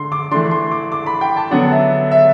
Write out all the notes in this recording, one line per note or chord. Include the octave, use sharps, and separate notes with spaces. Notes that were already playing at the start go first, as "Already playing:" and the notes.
Already playing: D3 C6
D6
E3 A3 D4 C6
C6
D6
D6
B5
G5
A5
D3 F#3 B3 D4 F#5
E5
E5